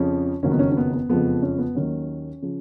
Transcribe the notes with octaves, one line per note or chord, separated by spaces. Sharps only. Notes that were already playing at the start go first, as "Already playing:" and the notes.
Already playing: F2 C#3 F3 C#4
F#1 F2 D#3 F#3 C#4
B3
C#4
C#4
B3
B3
F#1 F2 F3 G#3 B3
C#4
B3
D#2 D#3 F#3 C#4
C#3 F3